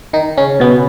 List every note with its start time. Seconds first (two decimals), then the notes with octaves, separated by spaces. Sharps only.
0.13 D#3 D#4
0.37 C#3 C#4
0.60 B2 B3